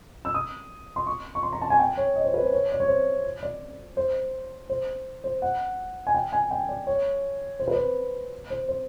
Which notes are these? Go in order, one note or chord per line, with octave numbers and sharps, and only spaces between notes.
E6
D#6
C6
C#6
C#6
C6
A#5
A5
G#5
G5
C#5
D#5
C5
B4
C5
C#5
D5
C#5
C5
D5
C5
C5
C5
F#5
G#5
G5
G#5
G5
D5
C#5
C5
B4
C5
C5
C5